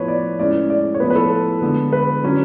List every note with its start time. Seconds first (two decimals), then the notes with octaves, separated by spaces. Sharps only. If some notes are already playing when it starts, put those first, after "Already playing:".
Already playing: A2 F3 B3 B4 C#5
0.08 D5
0.38 A2 G#3 C#4 D5
0.70 D5
0.94 C#5
1.00 A2 F3 B3 B4
1.10 B4
1.15 A4
1.62 D3 G#3 B3
1.93 B4
2.23 D3 F#3 C#4